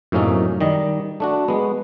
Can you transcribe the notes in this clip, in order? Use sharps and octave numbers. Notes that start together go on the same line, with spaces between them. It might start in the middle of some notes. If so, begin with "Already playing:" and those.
F#2 A2 C3 A#3 C#4 D#4
D#3 G3 D#5
A3 D4 F#4
G#3 B3